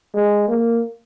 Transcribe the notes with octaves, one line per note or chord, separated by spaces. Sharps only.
G#3
A#3